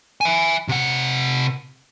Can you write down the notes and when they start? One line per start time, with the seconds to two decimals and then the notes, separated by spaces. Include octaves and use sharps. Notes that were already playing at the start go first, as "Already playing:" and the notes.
0.21 E5 G#5
0.68 C3 F#5